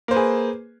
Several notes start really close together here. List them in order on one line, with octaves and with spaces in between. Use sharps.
A#3 C5 B4 G#4